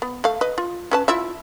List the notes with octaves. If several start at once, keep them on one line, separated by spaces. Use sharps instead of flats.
B3
A3 F5
B4 D#5
F4
C#4 B4 A5
E4 F4 E5